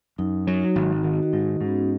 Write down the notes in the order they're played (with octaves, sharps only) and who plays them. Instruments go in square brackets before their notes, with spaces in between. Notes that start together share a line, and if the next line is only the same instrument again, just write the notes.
[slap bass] F#2 [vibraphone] D#4
[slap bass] F#3
[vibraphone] D#4
F#4
[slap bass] G#1
[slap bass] D#3 [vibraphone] F#4
[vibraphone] F#4
[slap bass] G#2 [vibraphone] D#4
[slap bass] G#2 [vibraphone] C#4
[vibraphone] B3
C#4